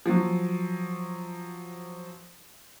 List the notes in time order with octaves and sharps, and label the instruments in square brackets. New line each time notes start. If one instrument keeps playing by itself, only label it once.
[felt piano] F3 F#3